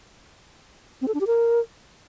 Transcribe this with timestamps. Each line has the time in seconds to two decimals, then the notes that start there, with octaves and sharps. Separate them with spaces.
1.02 C4
1.08 A4
1.14 D4
1.21 G4
1.27 A#4